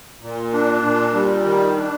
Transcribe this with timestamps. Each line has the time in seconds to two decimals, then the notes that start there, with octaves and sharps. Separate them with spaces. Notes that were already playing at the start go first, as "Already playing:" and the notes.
0.22 A#2
0.53 D4
0.83 A#2
1.13 G3
1.45 D#3
1.75 D4